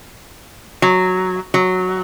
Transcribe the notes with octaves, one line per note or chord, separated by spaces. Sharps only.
F#3
F#3